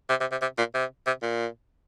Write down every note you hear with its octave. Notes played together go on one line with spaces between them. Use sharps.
C3
C3
C3
C3
A#2
C3
C3
A#2